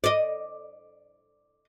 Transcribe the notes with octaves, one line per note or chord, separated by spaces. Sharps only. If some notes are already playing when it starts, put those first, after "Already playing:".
D5 D#5